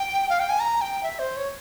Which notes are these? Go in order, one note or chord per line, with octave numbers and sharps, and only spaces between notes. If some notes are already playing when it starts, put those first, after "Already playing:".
Already playing: G5
F5
G5
G#5
A#5
G5
E5
C5
C#5